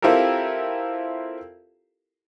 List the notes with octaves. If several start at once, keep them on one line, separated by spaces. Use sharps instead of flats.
C4 E4 F4 G4 A4 A#4